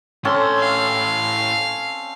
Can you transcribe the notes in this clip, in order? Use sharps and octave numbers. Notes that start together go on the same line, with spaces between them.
A2 C4 C#4 A4 C6
F5